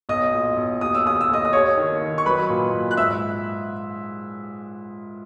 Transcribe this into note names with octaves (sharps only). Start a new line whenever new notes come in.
B1 D#5 D#6
A#2
B1
D#2 D#6
E6
D#2 D#6
E6
D#2 D#5 D#6
D#6
D#2 C#5 C#6
D#3
D#3
C#6
F#3 B4 B5
A#2
A#2
F#6
G#2 E5 E6